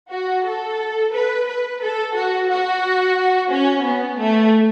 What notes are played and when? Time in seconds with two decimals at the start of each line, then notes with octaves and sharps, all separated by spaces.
0.11 F#4
0.46 A4
1.13 B4
1.47 B4
1.82 A4
2.16 F#4
2.49 F#4
3.51 C#4
3.85 B3
4.19 A3